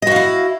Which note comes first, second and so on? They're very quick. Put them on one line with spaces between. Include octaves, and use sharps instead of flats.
D#5 F#4 F5 E4